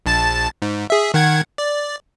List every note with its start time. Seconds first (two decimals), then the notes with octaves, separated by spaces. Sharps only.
0.06 A#1 A5 A6
0.62 G#2
0.90 G#4 E5
1.14 D#3 F#5 G#6
1.58 D5